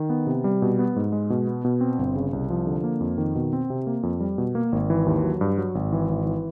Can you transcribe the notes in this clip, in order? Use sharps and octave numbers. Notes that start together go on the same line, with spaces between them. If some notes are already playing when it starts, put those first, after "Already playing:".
Already playing: D#3
B3
C3
G3
B2
B3
G#2
G#3
B2
B3
B2
C4
G1
C#3
C2
F3
D3
A#3
F2
D#3
B2
C4
C3
A#3
F2
G3
B2
A#3
G#1
E3
D#2
F#3
G2
F#3
G#1
E3
G#1
E3